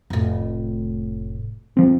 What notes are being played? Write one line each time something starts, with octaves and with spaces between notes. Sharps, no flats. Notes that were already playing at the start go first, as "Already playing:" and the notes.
F1 A2
D#1 F3 C4